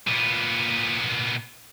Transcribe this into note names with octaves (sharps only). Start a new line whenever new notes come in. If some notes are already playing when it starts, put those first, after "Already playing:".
A#2 B3